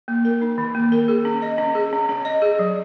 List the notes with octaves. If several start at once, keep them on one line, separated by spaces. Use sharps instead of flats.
A#3
A#4
D#4
D#3
A#3
A#4
G#4
C#4
D#5
C#4
G#4
C#4
C#4
D#5
G#4
F#3